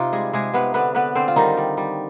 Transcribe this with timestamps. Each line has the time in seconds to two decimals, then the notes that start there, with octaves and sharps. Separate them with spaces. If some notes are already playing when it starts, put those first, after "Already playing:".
Already playing: C3 D#4 F4
0.13 G3 G#3 G#4
0.33 C3 G#3 G#4
0.54 C3 B3 B4
0.74 D3 B3 B4
0.95 D3 B3 B4
1.15 D3 C4 C5
1.28 F4
1.36 D#3 G3 D#4
1.57 G3
1.77 G3